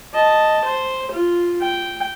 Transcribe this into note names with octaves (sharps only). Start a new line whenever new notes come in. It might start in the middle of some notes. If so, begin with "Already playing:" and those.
D#5 A5
C5
F4
G5